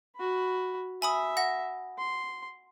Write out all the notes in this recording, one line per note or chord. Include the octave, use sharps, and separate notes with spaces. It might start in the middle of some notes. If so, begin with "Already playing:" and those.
F#4 B5
E5 G#5 B5 D#6
F#5 A#6
C6